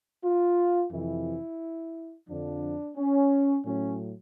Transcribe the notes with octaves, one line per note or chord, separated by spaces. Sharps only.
F4
F2 C3 E3 E4
F2 D3 F3 D4
C#4
A2 F#3 C#4